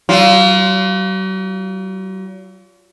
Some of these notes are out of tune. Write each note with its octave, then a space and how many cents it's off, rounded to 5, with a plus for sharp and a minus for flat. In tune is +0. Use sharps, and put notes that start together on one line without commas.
F#3 +45 F4 +0